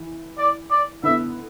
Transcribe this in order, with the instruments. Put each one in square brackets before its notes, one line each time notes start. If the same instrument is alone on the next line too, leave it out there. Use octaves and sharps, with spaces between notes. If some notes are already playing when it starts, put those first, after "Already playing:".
Already playing: [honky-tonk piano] E3
[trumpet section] D5
D5
[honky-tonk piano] D3 B3 E4 [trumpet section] E5